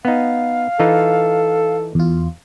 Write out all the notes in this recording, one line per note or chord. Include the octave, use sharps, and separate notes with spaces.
B3 D#4 F5
E3 D#4 F4 A4
E2 F4